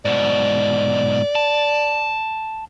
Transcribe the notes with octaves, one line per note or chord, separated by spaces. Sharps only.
G#2 B2 D5
A5